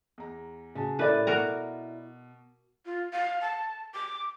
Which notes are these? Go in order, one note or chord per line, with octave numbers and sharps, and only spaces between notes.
E2 A#5
C#3 F#4 A5
A2 E4 G4 A#4 B4 D5 E5
B2 F#4 A#4 A#5
F4
F5
A5
D6